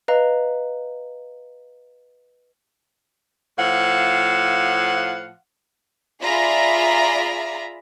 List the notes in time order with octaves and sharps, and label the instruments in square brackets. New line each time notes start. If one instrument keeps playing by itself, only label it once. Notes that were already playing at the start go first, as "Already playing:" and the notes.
[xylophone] B4 D#5 F5 A#5
[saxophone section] A2 F3 F5 F#5
[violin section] F4 G#4 D5 E5 A#5 B5